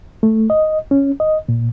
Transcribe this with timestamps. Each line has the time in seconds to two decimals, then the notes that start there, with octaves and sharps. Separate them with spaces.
0.23 A3
0.50 D#5
0.91 C#4
1.20 D#5
1.49 A#2